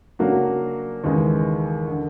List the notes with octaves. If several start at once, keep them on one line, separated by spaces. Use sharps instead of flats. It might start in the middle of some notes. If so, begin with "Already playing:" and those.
C#3 F#3 A#3 D4 F#4
D#2 C#3 E3 G#3
D3